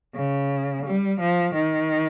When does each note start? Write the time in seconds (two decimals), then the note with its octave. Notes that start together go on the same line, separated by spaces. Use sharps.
0.16 C#3
0.85 G3
1.20 F3
1.55 D#3